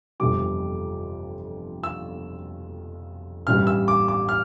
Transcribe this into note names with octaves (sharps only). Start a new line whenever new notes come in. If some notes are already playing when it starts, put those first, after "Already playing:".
G1 F2 C3 E3 G3 D6
E6
A1 G2 E3 G3 F6
E6
D6
D6
F6